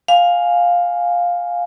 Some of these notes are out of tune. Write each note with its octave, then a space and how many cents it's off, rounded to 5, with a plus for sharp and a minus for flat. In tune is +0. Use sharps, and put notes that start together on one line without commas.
F5 +10 G#5 +0